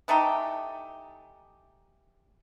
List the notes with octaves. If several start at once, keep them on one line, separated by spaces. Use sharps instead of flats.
E3 A3 D#4 G4